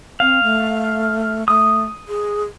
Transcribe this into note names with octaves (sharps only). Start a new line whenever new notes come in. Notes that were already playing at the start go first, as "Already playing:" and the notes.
C4 F5
A3
A3 D#6
G#4